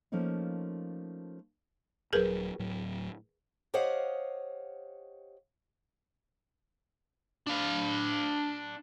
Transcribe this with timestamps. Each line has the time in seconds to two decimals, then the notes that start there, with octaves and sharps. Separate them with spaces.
0.12 F3 A3 A#3 C#4 D#4
2.13 D#1 G#2 F#3 G#4 A#4 B4
2.59 D1 A2 F#3
3.74 G4 C5 C#5 D#5 F5 F#5
7.47 D4 F5